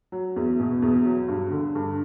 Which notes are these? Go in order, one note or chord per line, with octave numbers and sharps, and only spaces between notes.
F#3
E2
B2
E2
F#3
G2
D3
G2